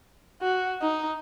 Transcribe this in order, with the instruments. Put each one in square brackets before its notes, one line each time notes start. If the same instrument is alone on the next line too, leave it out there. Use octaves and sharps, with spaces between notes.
[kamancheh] F#4
D#4